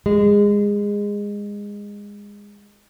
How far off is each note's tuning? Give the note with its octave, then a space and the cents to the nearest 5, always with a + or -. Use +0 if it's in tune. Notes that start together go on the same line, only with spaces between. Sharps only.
G#3 -20